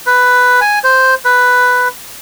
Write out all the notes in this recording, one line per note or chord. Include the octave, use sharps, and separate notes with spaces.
B4
G#5
C5
B4